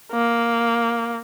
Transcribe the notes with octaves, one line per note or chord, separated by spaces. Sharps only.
A#3